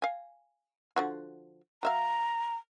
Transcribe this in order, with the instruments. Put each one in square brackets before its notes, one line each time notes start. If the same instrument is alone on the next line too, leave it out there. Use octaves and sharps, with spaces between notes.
[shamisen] F5 G#5
D3 F3 F#4
[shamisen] F#3 E5 F5 [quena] A#5